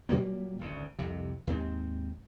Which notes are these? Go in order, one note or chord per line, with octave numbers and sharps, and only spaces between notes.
A#2 F#3 G3 A#3
G#1 D2 C#3
C2 F2 C3
D#2 G#2 C4